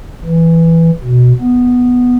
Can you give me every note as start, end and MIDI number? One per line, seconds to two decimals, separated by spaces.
0.25 0.90 52
1.04 1.33 47
1.40 2.17 59